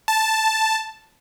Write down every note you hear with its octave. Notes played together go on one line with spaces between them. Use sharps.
A5